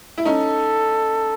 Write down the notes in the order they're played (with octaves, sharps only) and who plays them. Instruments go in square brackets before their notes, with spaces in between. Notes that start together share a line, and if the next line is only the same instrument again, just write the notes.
[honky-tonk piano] E4
[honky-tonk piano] C#4 D#4 [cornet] A4